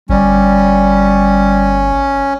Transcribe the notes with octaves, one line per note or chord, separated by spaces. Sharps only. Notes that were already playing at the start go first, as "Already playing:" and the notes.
G1 G3 C#4